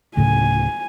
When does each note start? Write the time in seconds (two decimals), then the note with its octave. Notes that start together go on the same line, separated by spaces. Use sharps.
0.17 D1 A2 C#3 G#5